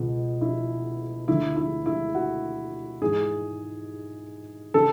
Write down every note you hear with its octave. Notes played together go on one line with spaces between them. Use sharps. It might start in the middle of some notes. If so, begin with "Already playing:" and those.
Already playing: C#2 B2
E4
D2 D3 E4
E4
E4
F#4
G#2 E3 G#4
C#3 E3 A4